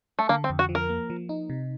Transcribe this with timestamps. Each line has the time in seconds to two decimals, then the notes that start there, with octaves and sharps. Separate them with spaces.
0.19 A3
0.29 D3 A#3
0.44 C4
0.50 F2
0.59 F#4
0.69 F3
0.75 A#4
0.89 A#3
1.10 F3
1.29 D#4
1.50 C3